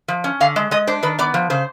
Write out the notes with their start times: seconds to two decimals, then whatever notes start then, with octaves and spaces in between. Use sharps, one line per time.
0.08 F3
0.24 C#4
0.40 D3 F5
0.56 G#3
0.71 G#3 D#5
0.87 D4 C5
1.03 D#3 B4
1.19 B3 D5
1.34 F3
1.50 C#3 C5